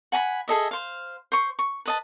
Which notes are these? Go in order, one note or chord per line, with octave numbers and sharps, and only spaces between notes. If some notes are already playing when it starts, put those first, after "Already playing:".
F#5 G#5 A#5 B5
G#4 A4 D#5 E5
C5 F5
C5 C#6
C#6
B4 D#5 A5